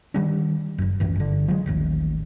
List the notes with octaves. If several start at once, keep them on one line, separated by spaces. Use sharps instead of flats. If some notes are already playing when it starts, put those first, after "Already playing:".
D#3 G3 D4
F#1 F#2
C2 F#2 A2 E3
G1 D3
F3 F#3 G#3
D#1 A1 D#2